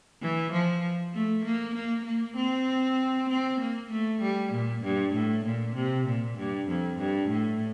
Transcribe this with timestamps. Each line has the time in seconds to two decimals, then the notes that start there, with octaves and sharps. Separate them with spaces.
0.21 E3
0.52 F3
1.14 A3
1.44 A#3
1.75 A#3
2.05 A#3
2.36 C4
3.29 C4
3.60 A#3
3.91 A3
4.21 G3
4.52 A#2
4.84 G2
5.14 A2
5.45 A#2
5.75 C3
6.06 A#2
6.37 G2
6.68 F2
6.99 G2
7.30 A2